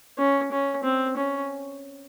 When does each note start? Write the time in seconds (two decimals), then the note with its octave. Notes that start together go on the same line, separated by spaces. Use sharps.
0.18 C#4
0.52 C#4
0.84 C4
1.17 C#4